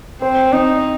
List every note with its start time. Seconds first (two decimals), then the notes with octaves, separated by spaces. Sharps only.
0.22 C4 C5
0.53 C4 D#4